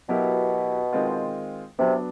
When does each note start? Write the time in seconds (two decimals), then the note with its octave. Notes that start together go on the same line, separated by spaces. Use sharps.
0.09 B2 F#3 B3 E4 G4 A#4
0.93 D#3 G#3 C4 F4
1.79 C3 F#3 B3 D4